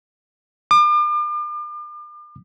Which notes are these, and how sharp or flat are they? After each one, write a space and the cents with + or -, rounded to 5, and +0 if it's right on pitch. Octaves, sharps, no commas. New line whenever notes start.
D6 +40